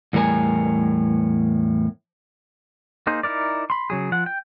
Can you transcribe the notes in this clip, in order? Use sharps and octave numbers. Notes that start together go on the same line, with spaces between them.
E2 A2 G3 A#4 G#5
A#3 D#4 G#4 C5
D#4 E4 A#4 D5
B5 C6
C#3 F#3 G#4
F3 F#5
G5